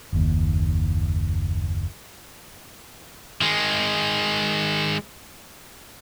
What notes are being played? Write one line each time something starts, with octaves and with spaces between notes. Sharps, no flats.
F#1 D#2
D#3 G#3